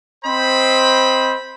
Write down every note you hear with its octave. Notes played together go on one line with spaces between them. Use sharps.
C4 C5 D#5 B5